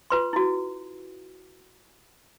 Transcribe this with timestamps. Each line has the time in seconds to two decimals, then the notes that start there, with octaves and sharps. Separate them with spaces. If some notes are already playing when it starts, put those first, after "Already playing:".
0.10 F4 B4 C6
0.33 E4 F#4